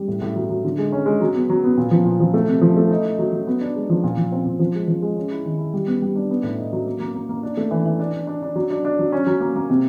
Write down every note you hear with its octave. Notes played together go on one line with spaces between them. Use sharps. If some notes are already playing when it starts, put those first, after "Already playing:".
Already playing: G3
A2
A2
F#3
F#3
D3
G#3
C#4
G#3
F#3
B3
F#3
B3
A#2
F3
A#2
F3
A3
C3
F3
A3
D#4
D#4
F#3
F#3
B3
D4
G#3
F3
A#2
F3
C4
A#2
F3
G#3
F3
G#3
C#4
E4
D#3
E4
G3
B3
G3
D4
B3
A2
D#4
F#3
A#3
A#3
A#3
A#3
D4
A3
E3
E3
D4
D4
D4
D4
F#3
D4
D4
F#3
C#4
F#3
A#3
A#3
C3